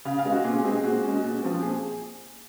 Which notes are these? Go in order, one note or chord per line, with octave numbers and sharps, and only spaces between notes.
C#3 F5
F5
G#3 C4
F#4
A#2 G#4
G#3 C4 G#4
A#2 F#4
G#3 C#4
A#2
F3 C4
A#2 G#4